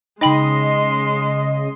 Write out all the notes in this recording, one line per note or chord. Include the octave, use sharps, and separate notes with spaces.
C#3 G#3 D#4 D#5 G5 B5 C6